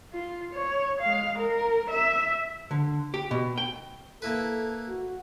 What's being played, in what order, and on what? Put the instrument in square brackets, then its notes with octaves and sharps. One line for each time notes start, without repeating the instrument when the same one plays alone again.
[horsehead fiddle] F4
C#5
G#3 F5
A#4
E5
[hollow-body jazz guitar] D3
G4
B2
G5
[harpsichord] A#3 E4 B4 [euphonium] A4
[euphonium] F#4